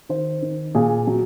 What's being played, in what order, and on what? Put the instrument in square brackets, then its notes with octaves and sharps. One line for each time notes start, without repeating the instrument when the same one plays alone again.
[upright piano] D#3 C5
D#3
A#2 G#4
F#3